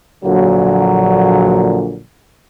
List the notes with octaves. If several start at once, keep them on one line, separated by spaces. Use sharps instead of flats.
A#1 A#2 D3 F#3